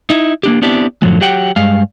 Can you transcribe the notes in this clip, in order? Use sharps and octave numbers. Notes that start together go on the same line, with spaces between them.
D#4 E4
A#3 D4 G4
B3 C4 D4 E4 G4
F#2 A2 D3 F3 F#3 G#3
F#3 G4 F#5 G5
G2 G#3 F5